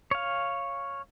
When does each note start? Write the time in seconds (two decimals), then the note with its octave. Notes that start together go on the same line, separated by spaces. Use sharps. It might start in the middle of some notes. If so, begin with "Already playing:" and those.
0.11 C#5 F5